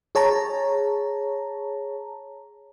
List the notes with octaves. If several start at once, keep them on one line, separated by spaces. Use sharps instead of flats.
G#4 C#5 A5 A#5